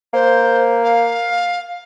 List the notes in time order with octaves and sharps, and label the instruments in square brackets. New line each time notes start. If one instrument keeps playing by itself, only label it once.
[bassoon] A#3 [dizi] C5
[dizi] F5